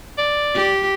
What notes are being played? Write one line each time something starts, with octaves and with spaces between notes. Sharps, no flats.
D5
G4